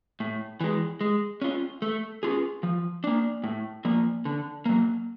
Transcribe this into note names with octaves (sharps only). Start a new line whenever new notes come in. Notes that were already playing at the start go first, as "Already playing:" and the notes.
A2
E3 G#3
G#3
C#4 F4
A3
C#4 F4 G#4
F3
A#3 D4
A2
F3 A#3
D3
F#3 A#3